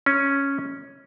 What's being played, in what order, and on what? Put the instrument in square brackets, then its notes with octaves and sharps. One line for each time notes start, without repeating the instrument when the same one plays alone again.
[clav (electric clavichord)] C#4